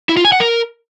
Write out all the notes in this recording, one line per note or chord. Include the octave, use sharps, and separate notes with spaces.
E4
F4
G#5
F#5
A#4